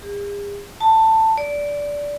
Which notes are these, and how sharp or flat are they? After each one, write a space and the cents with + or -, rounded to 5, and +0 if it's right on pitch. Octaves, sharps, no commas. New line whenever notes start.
G#4 -45
A5 +15
D5 -15